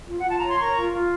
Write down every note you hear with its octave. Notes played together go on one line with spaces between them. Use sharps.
F4
F#5
F4 A5
C#5 A#5
C6
A#4 A#5 C#6
F4
F4